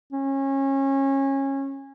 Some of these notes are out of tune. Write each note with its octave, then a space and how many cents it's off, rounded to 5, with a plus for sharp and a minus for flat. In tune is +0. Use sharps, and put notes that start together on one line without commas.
C#4 -25